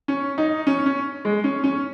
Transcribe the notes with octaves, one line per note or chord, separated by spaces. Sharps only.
C#4
D#4
C#4
C#4
G#3
C#4
C#4